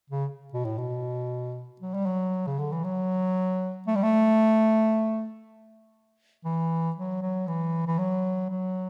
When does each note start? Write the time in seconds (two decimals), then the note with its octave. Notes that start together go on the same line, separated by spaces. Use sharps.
0.10 C#3
0.53 B2
0.65 A2
0.78 B2
1.81 F#3
1.94 G3
2.06 F#3
2.47 C#3
2.59 D3
2.72 E3
2.84 F#3
3.87 A3
3.96 G3
4.03 A3
6.44 E3
6.96 F#3
7.22 F#3
7.47 E3
7.87 E3
7.99 F#3
8.50 F#3